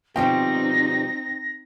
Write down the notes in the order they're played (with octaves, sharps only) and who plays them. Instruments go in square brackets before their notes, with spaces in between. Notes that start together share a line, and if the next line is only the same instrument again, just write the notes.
[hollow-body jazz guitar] B2 F3 G3 [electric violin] C4 D#4 [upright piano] G5 [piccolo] A#6